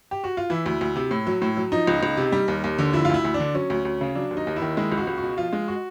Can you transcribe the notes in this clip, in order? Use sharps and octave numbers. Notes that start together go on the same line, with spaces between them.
G4
F#4
F4
E3 E4
D2
D2
C3
A2
F#3
A2
F#3
F3 D#4
C#2
C#2
C3
G3
D#2
D#2
D3
F3 E4
F4
D2 E4
D2
D4
D3
F#3 C#4
D2
D2
C#3
F#3 D4
D#2
D#4
D#2
E4
D#3
G#3 E4
C#2
F#4
C#2
F#4
B2
F3 F4
G#3
F#4